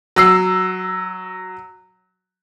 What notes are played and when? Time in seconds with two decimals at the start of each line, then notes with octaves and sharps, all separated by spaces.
0.16 F#3 E6 C7